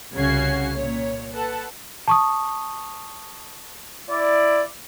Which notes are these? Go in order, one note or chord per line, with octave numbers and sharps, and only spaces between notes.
C2 C#3 C#4 F#4 G#6 C7
A#2 C#5
A4 B4 F#5 A5
A5 C#6 D#6
E4 D5